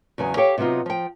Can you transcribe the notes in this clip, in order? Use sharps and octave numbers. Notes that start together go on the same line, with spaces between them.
E2 C#3 F#3 G#5
G4 A4 C#5 F5 G5
C3 F#3 B3 D#4 F4
F3 G5